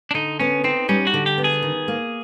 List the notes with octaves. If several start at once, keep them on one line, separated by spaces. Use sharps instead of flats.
D4
D3 D#4
B3 C#4
C4 D#4
G3 C#4
F#4
D3
G4
B3
G#4
D#3
A#3